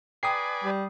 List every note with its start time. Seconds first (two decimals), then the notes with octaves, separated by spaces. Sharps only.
0.23 G#4 B4 D5 G5 G#5 A#5 D#6 C7
0.64 G3